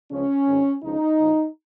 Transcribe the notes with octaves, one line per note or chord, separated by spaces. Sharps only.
C#2 C#3 F3 C#4
G#1 G#2 D#3
C#2 C#3 F3 D#4
A#1 A#2 F3